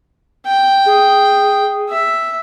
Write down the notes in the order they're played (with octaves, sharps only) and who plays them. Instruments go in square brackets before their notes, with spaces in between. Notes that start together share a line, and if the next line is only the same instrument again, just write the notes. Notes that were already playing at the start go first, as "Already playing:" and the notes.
[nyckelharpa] G5
[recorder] G#4
[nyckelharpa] E5